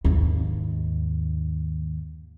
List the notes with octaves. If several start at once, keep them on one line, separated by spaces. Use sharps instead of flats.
D#2 G#2